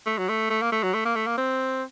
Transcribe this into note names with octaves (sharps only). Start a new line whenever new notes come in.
A3
F#3
A3
A3
A#3
A3
F#3
A3
A#3
A3
A#3
C4